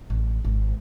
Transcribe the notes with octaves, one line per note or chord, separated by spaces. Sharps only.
A1
G#1